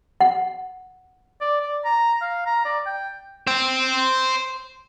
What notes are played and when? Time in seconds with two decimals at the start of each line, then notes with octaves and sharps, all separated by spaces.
0.21 F#5
1.41 D5
1.61 D5
1.85 A#5
2.21 F5
2.46 A#5
2.65 D5
2.86 G5
3.47 C5 G5